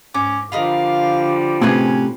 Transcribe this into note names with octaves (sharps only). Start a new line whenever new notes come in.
G#2 C#4 D6
D3 F3 G3 A#4 D#5 F5 B5
A2 C3 C#4 G#4 B4 C5